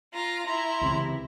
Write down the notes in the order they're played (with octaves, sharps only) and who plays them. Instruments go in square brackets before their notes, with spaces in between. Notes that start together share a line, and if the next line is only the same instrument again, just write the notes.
[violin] F4 A#5
[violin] E4 [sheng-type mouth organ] A#5 [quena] C6
[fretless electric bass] C#2 C3 E3